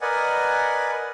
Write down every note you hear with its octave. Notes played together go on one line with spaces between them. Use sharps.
A#4 B4 D5 D#5 F#5 G#5